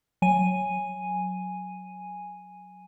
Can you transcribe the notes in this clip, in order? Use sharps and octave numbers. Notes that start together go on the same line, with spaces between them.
F#3 G#5 D#7